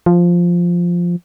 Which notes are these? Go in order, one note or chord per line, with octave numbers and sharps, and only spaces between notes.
F3